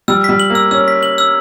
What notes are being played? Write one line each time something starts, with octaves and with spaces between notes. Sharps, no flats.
G3 E6
G3 B6
F#7
A#3
E6
C#4 E6
B6
F#7
E6